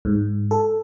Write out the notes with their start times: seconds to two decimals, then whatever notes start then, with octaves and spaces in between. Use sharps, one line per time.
0.05 G#2
0.51 A4